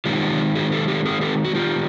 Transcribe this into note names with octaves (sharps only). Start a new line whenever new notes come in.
D#3 G#3 C4 D#4 F4 G4
F#4 G#4
G4 A4
G4 A4
G#4 A#4
G4 A4
F#4
F4 G4